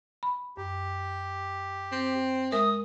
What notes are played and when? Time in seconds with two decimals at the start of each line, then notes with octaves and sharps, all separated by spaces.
0.23 B5
0.57 F#2 G4
1.92 C4
2.52 G#3 A#4 E5 D#6